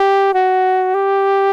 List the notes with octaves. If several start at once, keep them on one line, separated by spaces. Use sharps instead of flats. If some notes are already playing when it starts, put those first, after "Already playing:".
Already playing: G4
F#4
G4